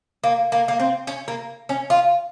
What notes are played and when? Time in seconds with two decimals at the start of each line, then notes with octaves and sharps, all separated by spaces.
0.24 A#3
0.52 A#3
0.68 A#3
0.80 C4
1.07 C#4
1.28 A#3
1.69 C#4
1.90 F4